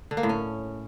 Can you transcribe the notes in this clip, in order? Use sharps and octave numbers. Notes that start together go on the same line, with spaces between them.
D3
A#3
A2
C#4